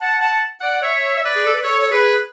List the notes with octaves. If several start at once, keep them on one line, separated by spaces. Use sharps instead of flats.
F#5 A5
F#5 A5
D5 F#5
C#5 E5
E5
B4 D5
G#4
A4
B4
A4 C#5
C#5
G#4 B4